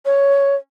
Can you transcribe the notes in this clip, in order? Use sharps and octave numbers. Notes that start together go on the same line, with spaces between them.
C#5